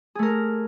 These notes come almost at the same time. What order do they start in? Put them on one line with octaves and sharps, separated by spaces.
G#4 A3 A#4